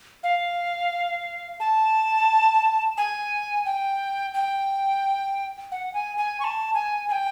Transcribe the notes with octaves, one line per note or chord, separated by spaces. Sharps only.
F5
A5
G#5
G5
G5
F#5
G#5
G#5
C#6
A5
G#5
G#5
G5